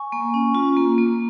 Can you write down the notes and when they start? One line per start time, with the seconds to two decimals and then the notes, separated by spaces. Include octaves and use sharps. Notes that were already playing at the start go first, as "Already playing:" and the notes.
Already playing: G#5 C#6
0.12 A#3
0.34 C#4
0.55 F4
0.77 A#3
0.98 A#3